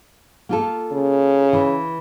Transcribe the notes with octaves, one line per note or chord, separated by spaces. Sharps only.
A#3 F4 A4
C#3
E3